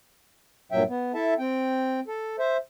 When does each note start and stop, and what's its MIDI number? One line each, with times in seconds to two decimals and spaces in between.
0.72 0.83 43
0.72 0.83 46
0.72 0.83 54
0.72 0.83 76
0.72 0.83 79
0.89 1.12 59
1.14 1.34 64
1.14 1.34 69
1.14 1.34 76
1.14 1.34 81
1.39 2.00 60
1.39 2.00 79
2.08 2.36 69
2.39 2.57 72
2.39 2.57 76